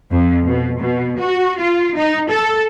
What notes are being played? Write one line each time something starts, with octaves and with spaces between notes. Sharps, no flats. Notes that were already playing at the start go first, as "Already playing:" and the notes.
F2
B2
B2
F#4
F4
D#4
A4